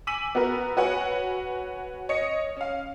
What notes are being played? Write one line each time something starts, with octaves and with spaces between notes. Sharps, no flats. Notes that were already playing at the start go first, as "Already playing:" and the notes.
G#5 D6 E6 B6 D#7 F#7
B3 F#4 A#4 B4
F#4 B4 C#5 F#5 G#5
C#5 D#5 C#7
C#4 F5